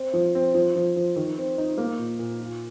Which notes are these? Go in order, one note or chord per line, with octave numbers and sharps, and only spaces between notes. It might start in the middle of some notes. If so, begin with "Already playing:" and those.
Already playing: C4
F3
C4
F3
F3
F3
D#3
C4
D#4
A#3
A#2
A#2
F4